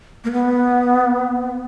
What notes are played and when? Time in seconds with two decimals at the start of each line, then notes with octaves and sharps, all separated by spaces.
0.25 A#3
0.32 B3